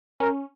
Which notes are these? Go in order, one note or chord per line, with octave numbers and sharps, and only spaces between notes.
C#4 A#4